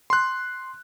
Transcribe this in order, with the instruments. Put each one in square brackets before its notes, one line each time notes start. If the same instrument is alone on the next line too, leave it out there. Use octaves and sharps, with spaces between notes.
[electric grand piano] C6 F#6